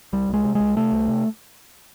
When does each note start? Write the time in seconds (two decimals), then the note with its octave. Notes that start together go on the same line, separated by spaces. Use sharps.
0.13 C2 G3
0.29 C2 G#3
0.44 C3
0.55 C2 G#3
0.76 C3 A3
0.92 C2
1.08 C3